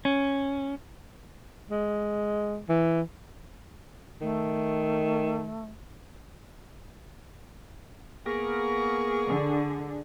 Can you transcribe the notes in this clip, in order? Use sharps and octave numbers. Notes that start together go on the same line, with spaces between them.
C#4
G#3
E3
D#3 A3
A#3 B3 G#4 A#4 C#6
D3